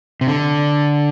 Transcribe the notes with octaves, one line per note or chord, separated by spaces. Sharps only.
C3
D3